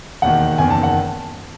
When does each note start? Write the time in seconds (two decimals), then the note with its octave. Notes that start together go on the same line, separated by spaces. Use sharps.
0.22 E1 D#2 D#3 F#5
0.58 F#1 E2 D#3 G#5
0.70 A5
0.83 F#5